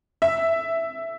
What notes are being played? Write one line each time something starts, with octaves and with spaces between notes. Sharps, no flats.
E5